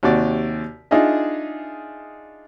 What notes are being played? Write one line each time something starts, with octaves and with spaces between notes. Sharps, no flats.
D#2 C3 F#4 D5
D4 D#4 F4 G#4 D#5 E5